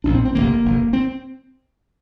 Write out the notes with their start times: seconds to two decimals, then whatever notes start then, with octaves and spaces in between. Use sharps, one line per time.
0.04 A#1 A#2 D4
0.15 C4
0.25 C4
0.35 F1 D#2 D3 A#3
0.64 F1 F2 D3
0.93 C4